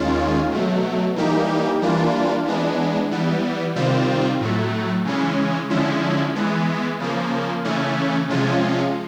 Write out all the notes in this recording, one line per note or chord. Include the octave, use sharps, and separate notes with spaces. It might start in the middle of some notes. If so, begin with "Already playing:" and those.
Already playing: D#2 D#3 G#3 C#4 F4
B2 F#3 A3
E3 G3 A#3 D#4 G4
E3 G3 A#3 D4 F4
E3 G#3 B3 D4
E3 G3 B3
C3 D#3 G3 C4 F4
A2 F#3 A3
C#3 E3 G#3 C#4
D3 F3 G#3 C#4 E4
E3 G#3 B3
C#3 F3 A#3
C#3 E3 A3 C#4
C3 F3 G#3 C#4 F4